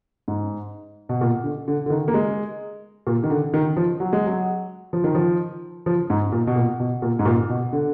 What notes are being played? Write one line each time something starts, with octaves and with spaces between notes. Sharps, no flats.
G#2
B2
A#2
D3
D3
D3
D#3
A#3
G#3
A#2
D#3
D3
D#3
F3
F#3
G#3
F#3
F3
D#3
F3
F3
G#2
A#2
B2
A#2
B2
A#2
G#2
A#2
B2
D3